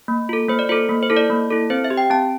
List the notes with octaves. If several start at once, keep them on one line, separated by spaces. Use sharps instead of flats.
A#3
F4 A4
A#3 C5
D5
F4 A4 C5
A#3
C5
E4 A4
D5
A#3
E4 A4
C4 C5
E5
G4
G5
C4 A5